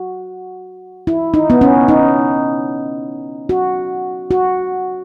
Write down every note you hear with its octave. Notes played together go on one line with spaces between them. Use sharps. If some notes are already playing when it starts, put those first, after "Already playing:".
Already playing: F#4
E4
D#4
B3
C#4
D#4
F#4
F#4